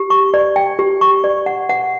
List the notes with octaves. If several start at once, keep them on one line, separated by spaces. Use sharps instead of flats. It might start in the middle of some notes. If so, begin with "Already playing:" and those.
Already playing: G4
C#6
D5
G5
G4
C#6
D5
F#5
F#5